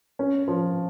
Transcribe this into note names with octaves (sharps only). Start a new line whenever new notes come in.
C#4
F3